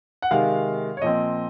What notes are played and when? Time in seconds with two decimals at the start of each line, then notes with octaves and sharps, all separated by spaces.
0.22 F#5
0.31 C3 D#3 G#3 F5
0.97 C#5
1.02 A#2 F3 C4 D#5